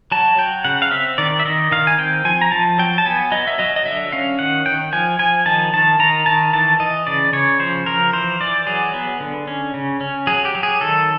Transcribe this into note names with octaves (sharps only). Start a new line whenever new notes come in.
F#3 A5
F#3 G5
C#3 F#5
F5
C4 E5
D#3 D5
E5
D#3 D#5
D#3 F5
G#5
C4 G5
F3 G#5
A#5
F3 A5
F#3 G5
A5
B3 G#5
F#3 D#5
E5
F#3 D#5
D#5
D3 E5
C#4 F5
D#3 F#5
D#3 G5
F3 G#5
F3 G#5
D#3 A5
D#3 A5
D#3 A#5
D#3 A5
E3 A5
E3 D#5
C#3 D5
C#3 C#5
F3 C5
F3 A#4
E3 C5
E3 D5
F#3 G#4
B3
D3
C#4
C#3
C#4
F#3 G#4
G4
F#3
G#4
D#3 A4